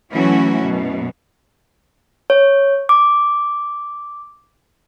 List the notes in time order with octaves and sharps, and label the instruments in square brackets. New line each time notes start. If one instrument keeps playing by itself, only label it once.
[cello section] E3 F#3 A3 C#4 E4 F#4
F#2 B2
[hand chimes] C#5
D6